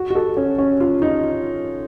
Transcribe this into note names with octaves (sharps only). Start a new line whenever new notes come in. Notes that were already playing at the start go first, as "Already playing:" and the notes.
Already playing: F#4
F#4
A4
C#4
C#4
F4
D#4